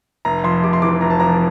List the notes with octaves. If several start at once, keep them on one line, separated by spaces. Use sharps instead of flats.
F1 A#5
F2 C6
C3 D6
C6
E3 D6
F1 A#5
A5
F2 A#5